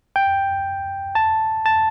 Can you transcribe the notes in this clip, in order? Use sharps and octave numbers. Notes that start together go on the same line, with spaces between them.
G5
A5
A5